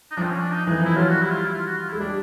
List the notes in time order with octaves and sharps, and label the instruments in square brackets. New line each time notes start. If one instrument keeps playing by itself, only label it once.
[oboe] D#4
[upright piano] F3 [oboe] D4
[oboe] C4
C#4
D4
D#4
[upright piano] E3
[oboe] D#4
[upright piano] F3 [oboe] E4
[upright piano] F#3 [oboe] F4
[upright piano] G3 [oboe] F#4
[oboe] E4
F4
E4
F4
F#4
F4
[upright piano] G#3 [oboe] E4
[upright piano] G3 [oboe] D4